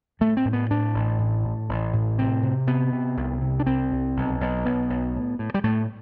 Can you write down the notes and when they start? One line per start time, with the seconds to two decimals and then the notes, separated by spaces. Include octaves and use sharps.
0.20 A2 A3
0.37 C4
0.45 A2
0.53 B3
0.71 A2 D4
0.94 A1
1.19 A2
1.45 A2
1.69 A1
1.93 A2
2.18 C3 C4
2.43 C3
2.67 C3 B3
2.93 C3
3.17 C2
3.42 C3
3.60 D4
3.66 C2 C4
3.91 C2
4.17 B1
4.41 B1
4.65 B1 B3
4.90 B1
5.15 A2
5.39 A2
5.54 G3
5.64 A2 A3